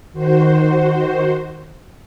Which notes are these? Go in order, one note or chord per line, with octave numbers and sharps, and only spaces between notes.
D#3 F#4 C5